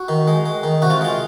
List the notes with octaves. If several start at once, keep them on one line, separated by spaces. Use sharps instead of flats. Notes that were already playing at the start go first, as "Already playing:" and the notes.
Already playing: F#4
D#3
G#3
G#3
D#3
C3 F#4
F4
G#3 F4